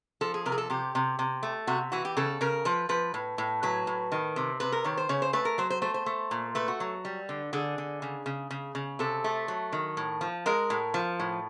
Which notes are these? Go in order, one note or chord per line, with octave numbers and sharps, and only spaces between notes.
F3 A4
G#4
C3 A#4
G#4
A4
C3 G4
C3
C3
A3
C3 F#4
E3 F#4
G4
C#3 A4
C#3 A#4
F3 B4
F3 B4
A2
A2
F#3 B4
A2
D#3
C3
C3 B4
A#4
D#3 C#5
C5
C#3 C#5
C5
A3 B4
A#4
F#3 C5
C5
A3 C5
C5
A3
A#2
A3 B4
F#4
F#3
G3
D3
D3 G#4
D3
C#3
C#3
C#3
C#3
C3 A4
A3
F#3
D#3
A2
F3
G#3 A#4
A2
F3
A2